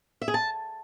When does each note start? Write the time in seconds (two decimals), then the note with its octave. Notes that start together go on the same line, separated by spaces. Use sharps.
0.21 E5
0.28 G#4
0.34 A5